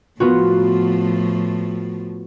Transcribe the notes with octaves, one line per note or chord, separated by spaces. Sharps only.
A2 F3 B3 F4 F#4